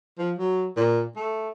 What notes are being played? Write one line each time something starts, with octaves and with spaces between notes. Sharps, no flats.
F3
F#3
A#2
A3